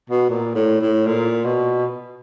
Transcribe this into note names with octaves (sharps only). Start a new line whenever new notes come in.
B2
A#2
A2
A2
A#2
B2